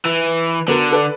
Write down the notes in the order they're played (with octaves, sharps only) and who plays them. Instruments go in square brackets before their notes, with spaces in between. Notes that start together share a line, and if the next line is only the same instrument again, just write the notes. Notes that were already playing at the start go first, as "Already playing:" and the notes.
[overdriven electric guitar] E3
[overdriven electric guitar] D3 [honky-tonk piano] B3 F#4 A#4
[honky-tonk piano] A4 B4 D5